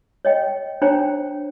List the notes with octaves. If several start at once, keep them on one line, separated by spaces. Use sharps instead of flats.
C#5 D#5 G5
D4 C5 C#5 G5 A#5